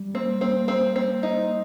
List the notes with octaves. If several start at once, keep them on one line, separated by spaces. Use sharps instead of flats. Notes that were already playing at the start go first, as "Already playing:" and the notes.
Already playing: G3
A#3 C4
A#3 C4
C4
C4
D#4